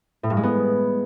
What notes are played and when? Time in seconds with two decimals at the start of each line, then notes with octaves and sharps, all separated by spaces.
0.23 A2
0.30 G2
0.37 G#3
0.43 B3